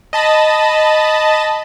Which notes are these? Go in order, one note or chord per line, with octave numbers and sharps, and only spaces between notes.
D#5 A5 B5